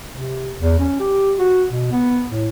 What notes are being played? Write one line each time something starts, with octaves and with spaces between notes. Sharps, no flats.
C3
E2
C#4
G4
F#4
B2
B3
A2